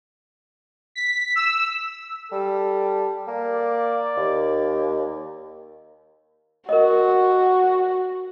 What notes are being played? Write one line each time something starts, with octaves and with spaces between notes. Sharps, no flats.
B6
E6
G3 A4
A#3 D5
D#2
F#4 A#4 D#5